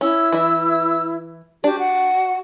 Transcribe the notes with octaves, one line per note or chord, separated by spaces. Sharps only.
C#4 E4 E6
E3 E5
D4 F#4 G4
F#5